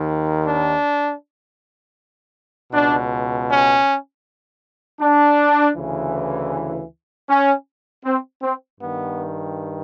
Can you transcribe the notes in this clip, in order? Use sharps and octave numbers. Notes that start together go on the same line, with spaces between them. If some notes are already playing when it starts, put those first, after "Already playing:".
Already playing: D#2 D#3
D4
C#2 B2 D4
C#4
D4
D2 C#3 E3
C#4
C4
C4
G2 D#3 B3